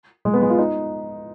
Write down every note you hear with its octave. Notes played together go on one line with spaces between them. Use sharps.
G#3
B3
G#3
F4
D#4